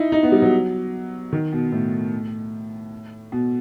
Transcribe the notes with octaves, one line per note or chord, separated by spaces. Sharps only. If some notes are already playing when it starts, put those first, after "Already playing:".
Already playing: D#4 E4
D#4
B3
G3
F#3
D#3
B2
A2
B2